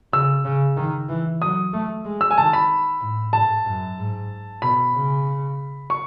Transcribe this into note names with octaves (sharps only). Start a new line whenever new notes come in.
C#3 E6
C#3
D#3
E3
F#3 D#6
A3
G#3
E6
G#5
D#3 A5
B5
A2
G#2 A5
F#2
G#2
B2 B5
C#3
C#6